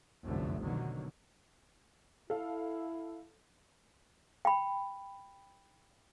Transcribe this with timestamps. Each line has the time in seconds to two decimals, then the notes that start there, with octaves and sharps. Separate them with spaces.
0.24 F1 C2 F#2 D3 A3
0.62 B2 D3 D#3 F#3
2.30 E4 A4 F5
4.45 G5 B5